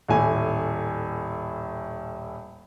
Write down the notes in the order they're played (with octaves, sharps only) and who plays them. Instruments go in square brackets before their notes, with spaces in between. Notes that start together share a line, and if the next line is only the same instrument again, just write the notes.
[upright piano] D#1 A2 G#5